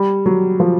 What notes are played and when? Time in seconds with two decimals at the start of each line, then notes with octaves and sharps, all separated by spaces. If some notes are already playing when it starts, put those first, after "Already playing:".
Already playing: G3
0.26 F#3
0.60 F3